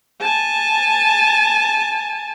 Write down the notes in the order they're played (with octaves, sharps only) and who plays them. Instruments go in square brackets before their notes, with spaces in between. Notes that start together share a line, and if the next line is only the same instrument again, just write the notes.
[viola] G#5 A5